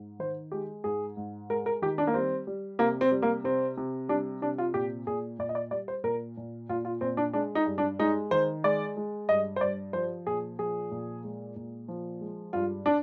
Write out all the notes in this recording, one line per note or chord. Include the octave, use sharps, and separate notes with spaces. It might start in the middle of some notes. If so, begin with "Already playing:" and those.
Already playing: G#2
D#3 C5
G#3 G4
G#2 G#4
G#2
G#3 A#4
A#4
D#3 G4
D4
A#3
G3 C4
G3
C3 A#3
C4
G3
A#3
C3 C4
C3
G3 D4
C3 D4
F4
A#2 G4
A#2 G#4
A#2 D5
D#5
D5
G3 D5
C5
A#2 A#4
A#2
A#2 F4
F4
A#2 C4
D4
G#3 D4
D#4
G2
D4
G#3 D#4
D#3 C5
G#3 D5
G#3
G2 D#5
C5
G2 D5
F3 C5
A#2 G#4
F3 G#4
A#2
G#3
A#2
F3
G#3
G2 F4
D4